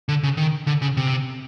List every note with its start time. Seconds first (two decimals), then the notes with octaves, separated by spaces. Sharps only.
0.09 D3
0.23 C#3
0.37 D#3
0.67 D3
0.82 C#3
0.97 C3